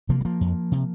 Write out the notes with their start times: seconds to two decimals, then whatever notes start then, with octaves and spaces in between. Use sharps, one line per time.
0.09 C3 F3 A#3
0.21 G3
0.25 F3 A#3
0.41 F2
0.72 C3